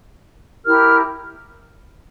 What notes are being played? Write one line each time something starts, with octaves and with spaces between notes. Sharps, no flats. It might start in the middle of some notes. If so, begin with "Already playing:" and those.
E4 G4 A#4 F6